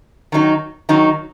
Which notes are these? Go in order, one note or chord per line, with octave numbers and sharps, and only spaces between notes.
D#3 F#3 D#4
D#3 F#3 D#4